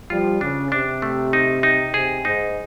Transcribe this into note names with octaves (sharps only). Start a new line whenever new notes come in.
F3 G3 F4
C#3 D4
C3 D4
A3
D#4
D#4
C3 G#4
G#2 D#4